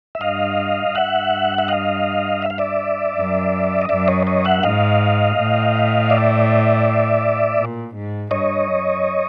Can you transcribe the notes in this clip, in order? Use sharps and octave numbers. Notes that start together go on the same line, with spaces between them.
E5
G2 D#5 F5
G2 E5 F#5
E5
D#5 F5
E5
F5
D5 E5
F#2
D#5
F#2 D5 E5
C#5 D#5
C#5 D#5
E5 F#5
G#2 D#5 F5
A2
D5 E5
A#2
G#2
G2 C#5 D#5
F#2